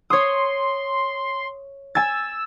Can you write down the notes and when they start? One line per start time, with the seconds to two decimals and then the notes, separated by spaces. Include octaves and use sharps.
0.10 C#5 C6 D#6
1.95 G#5 E6 A6